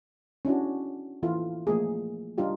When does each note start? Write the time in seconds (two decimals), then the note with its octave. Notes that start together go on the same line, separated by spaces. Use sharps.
0.45 C#4 D4 E4 F#4
1.23 E3 E4 F4 A4
1.67 F3 A3 A#3 G#4
2.38 G3 D4 D#4 F4 G4